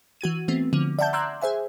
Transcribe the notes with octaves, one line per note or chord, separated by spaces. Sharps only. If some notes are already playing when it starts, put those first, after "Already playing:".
E3 F#4 G#6 D#7
E3 A3 B3 C4
D3 F3
D5 E5 F#5 A5 G6
A#5 C6 D6 E6 F#6 G#6
G#4 C5 E5 G#5